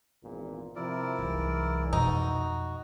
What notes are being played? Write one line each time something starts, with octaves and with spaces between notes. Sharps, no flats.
G#1 E2 A#2
C3 F3 E4 A#4 D5
C2 G#2 E3 F#3
F2 B2 D#4 F#4